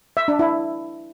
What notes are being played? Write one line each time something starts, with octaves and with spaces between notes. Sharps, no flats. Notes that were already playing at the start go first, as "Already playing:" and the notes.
E5
D4
E4